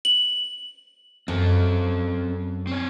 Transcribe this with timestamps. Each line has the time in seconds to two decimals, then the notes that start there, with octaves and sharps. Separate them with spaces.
0.05 F#7
1.28 F#2 C4 A4
2.67 C4 C#5